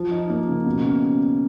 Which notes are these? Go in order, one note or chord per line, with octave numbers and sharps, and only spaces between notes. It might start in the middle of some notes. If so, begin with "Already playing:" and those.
Already playing: F3
D#4
A#3
C#3
B2
C#4